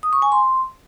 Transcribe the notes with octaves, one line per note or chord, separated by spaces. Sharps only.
D#6
C#6
G#5
C6